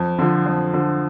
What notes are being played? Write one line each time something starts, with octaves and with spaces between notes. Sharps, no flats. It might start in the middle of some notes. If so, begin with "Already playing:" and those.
Already playing: F2
D3 F3
F2
D3 F3